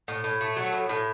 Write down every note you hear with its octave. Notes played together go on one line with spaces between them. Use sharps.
A2
A2
A3
F#3
A2
A2